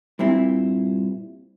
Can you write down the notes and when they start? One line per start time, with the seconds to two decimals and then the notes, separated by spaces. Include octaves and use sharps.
0.19 G2 A#2 C4 E4